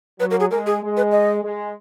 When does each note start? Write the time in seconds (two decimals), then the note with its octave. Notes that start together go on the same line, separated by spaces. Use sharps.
0.20 F#3 B4
0.31 A#4
0.40 G#4
0.50 G#3 A#4
0.66 G#4
0.81 G#3
0.97 B4
1.12 D#5
1.43 G#3